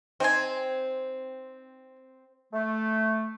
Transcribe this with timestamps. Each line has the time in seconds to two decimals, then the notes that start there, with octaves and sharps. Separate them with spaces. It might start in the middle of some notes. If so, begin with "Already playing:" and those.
0.20 C4 D#4 G#5
2.53 A3